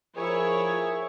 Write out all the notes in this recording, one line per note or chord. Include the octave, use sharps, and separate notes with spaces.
F3 E4 G#4 A#4 C#5